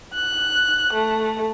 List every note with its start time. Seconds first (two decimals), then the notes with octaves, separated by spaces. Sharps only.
0.14 F#6
0.93 A3